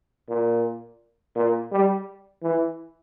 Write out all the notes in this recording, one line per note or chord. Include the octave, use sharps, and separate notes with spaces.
A#2
A#2
G3
E3